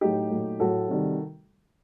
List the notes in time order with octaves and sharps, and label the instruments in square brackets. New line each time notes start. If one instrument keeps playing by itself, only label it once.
[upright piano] A2 F#3 A3 D#4 G4
A#2 F#3 A3
A2 F#3 A3 F#4 A4
C3 D#3 G3